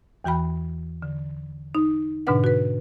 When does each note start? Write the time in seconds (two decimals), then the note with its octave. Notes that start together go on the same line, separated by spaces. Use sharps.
0.24 E2 E3 F#4 G5 B5
1.02 D3
1.75 D#4
2.27 G#2 B2 D3 D4 B4 F#5
2.44 F#4 B4